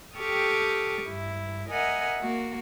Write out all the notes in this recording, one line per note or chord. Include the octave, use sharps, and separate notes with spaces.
G4 A4 G5 C#6 D#6 F6
G2 E4
A#4 D#5 E5 F#5 G#5 A#5
A#3 F#4